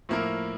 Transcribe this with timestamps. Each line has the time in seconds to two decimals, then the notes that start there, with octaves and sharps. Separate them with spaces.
0.09 A2 F3 A#3 E4 A#4